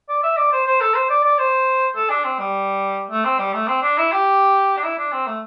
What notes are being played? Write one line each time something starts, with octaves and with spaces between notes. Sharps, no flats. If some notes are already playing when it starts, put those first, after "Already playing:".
D5
E5
D5
C5
C5
A4
C5
D5
D5
C5
A4
D4
C4
G3
A3
C4
G3
A3
C4
D4
E4
G4
D4
E4
D4
C4
A3